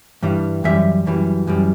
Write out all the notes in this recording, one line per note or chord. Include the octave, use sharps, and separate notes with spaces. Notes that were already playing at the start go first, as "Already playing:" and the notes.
G2 E3 G3
F#2 E3 G3 E5
F#2 E3 G3
F#2 E3 G3